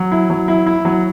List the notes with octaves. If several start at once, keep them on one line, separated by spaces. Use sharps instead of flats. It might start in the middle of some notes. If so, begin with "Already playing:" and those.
Already playing: F#3
E4
F#3
E4
E4
F#3